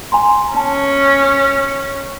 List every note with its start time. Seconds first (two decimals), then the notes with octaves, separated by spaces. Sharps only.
0.12 G#5 A#5 C6
0.56 C#4 A5